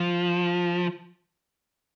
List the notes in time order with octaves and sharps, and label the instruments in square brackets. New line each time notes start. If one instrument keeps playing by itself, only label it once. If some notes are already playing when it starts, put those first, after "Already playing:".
Already playing: [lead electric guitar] F3